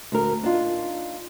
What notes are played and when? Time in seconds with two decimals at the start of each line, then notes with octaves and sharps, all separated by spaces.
0.12 D2 A#4
0.43 D4 D#4 F4